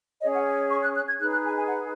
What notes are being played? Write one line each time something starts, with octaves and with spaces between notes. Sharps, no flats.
C#4 G#4 C#5 D#5
F#5
C#6
F#6
F#6
G#6
D#4 G#4 B4 F#6
F#6
G#5
G#5
F#5